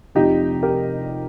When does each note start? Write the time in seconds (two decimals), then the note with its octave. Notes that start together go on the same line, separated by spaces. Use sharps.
0.15 F1 F2 C3 F3 D#4 G4
0.63 G4 A#4